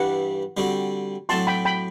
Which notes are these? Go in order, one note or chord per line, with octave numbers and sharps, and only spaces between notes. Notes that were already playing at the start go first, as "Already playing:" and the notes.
Already playing: G2 E3 G3 D4 F#5
D3 G3 C4 F#4
A2 F#3 C4 F#4 A5 C6
G5 B5
G5 B5